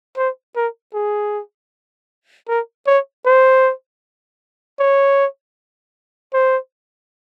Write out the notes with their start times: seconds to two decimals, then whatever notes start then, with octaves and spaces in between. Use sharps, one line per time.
0.17 C5
0.56 A#4
0.94 G#4
2.48 A#4
2.87 C#5
3.26 C5
4.79 C#5
6.34 C5